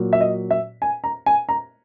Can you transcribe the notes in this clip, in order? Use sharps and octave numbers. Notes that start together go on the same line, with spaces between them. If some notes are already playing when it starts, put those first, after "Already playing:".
Already playing: A#2 F#3
E5
D#5
E5
G#5
A#5
G#5
A#5